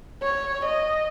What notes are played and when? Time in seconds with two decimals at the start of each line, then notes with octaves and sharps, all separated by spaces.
0.23 C#5
0.65 D#5